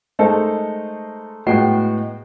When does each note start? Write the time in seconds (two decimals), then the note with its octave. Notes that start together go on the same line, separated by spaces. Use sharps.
0.19 G#3 A3 D#4 A4 A#4 C5
1.47 A2 G#3 B3 F#4 G5 C7